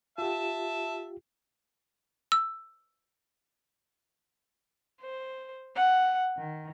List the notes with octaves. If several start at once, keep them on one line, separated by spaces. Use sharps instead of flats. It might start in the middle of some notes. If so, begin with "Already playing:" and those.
F4 G4 E5 A5
E6
C5
F#5
D#3